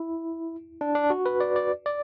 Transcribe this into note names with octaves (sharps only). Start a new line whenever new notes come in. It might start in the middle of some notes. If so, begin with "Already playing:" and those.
Already playing: E4
D4
D4
F#4
B4
D5
D5
D5